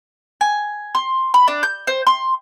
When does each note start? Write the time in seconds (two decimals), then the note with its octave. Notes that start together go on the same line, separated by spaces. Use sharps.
0.41 G#5
0.95 C6
1.34 B5
1.48 D4
1.63 G6
1.87 C5
2.07 C6